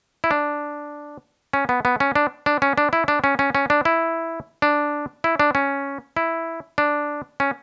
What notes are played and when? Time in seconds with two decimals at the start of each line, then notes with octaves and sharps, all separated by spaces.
0.24 E4
0.31 D4
1.54 C#4
1.69 B3
1.85 B3
2.00 C#4
2.16 D4
2.46 D4
2.62 C#4
2.78 D4
2.93 E4
3.08 D4
3.24 C#4
3.39 C#4
3.55 C#4
3.70 D4
3.85 E4
4.62 D4
5.24 E4
5.40 D4
5.55 C#4
6.17 E4
6.78 D4
7.40 C#4